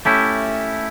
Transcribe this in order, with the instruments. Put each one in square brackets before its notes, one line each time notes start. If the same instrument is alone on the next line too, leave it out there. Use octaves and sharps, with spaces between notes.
[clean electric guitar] A3 C#4 E4 G4